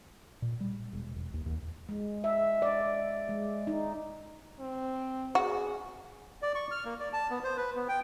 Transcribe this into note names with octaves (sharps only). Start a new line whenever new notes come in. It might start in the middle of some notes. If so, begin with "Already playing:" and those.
A#2
G3
E1
E1
D#2
D#2
G#3
E5
D5
G#3
D#4
C4
F#4 G#4
D5
C#6
F6
A#3
D5
A5
B3
C5
B4
B3
G5